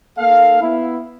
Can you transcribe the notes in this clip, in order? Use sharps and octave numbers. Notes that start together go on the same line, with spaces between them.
A#3 D#4 A4 F5
B3 E4